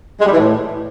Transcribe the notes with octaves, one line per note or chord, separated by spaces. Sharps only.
G#3
G3
E3
A2